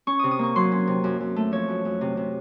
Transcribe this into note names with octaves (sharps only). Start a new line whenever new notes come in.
C#4 C#6
C3 D#6
D#6
A#3 C#6
F#3 C6
C#4
C3
F#2
F#2
A3
F3 C#5
F#2
F#2
C3
C3